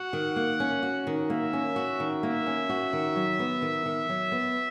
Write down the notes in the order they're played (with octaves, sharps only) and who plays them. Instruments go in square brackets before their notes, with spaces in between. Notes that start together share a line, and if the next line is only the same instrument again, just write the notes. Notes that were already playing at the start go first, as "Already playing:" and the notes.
Already playing: [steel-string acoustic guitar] F#4 [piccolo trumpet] F#5
[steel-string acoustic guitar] D#3
A#3
C#4
F#4
D#3
[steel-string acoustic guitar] A#3 [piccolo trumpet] E5
[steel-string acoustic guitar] C#4
F#4
D#3
[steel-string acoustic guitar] A#3 [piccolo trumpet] E5
[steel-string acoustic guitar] C#4
F#4
D#3
F#3
B3
D#3
D#3
F#3
B3